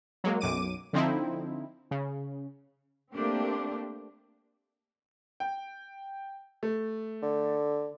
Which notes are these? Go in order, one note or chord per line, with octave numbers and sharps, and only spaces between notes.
F#3 G#3 A#3
B1 F#2 D6 D#7
D3 F3 C4 D#4 E4
C#3
A3 A#3 C4 D4 G4
G5
A3
D3